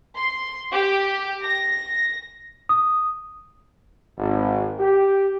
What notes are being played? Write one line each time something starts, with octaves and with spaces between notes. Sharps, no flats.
C6
G4
A#6
D#6
G#1
G4